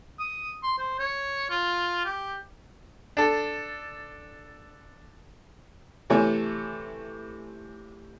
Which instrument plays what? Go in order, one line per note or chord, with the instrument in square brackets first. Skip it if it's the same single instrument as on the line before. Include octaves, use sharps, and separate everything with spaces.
[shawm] D#6
C6
C5
C#5
F4
G4
[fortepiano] D4 A4
C3 E3 A3 C#5 G#5